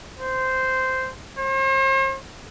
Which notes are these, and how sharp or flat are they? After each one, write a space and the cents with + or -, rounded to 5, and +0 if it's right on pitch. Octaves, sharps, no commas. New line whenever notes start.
C5 -10
C5 +45